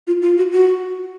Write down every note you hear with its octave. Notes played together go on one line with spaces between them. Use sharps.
F4
F4
F#4
F#4